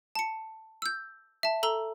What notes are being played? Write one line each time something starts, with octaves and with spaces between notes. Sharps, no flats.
A5 C#7
E6 G6
E5 A5
A4 A#5 E6 G7